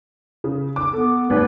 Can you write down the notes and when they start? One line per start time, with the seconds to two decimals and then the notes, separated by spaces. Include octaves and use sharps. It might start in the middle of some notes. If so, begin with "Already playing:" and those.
0.44 C#3
0.76 D6
0.93 B3 A4
1.30 G#1 D#2 B4